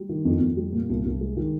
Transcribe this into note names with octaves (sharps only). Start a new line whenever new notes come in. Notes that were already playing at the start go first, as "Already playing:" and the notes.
Already playing: G3
D#3
F2
F2
G3
A#2
C2
C2
G#3
D#3